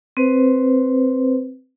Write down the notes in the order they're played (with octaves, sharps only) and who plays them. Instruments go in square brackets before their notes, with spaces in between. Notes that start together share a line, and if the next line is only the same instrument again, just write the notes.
[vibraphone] C4 B4 C5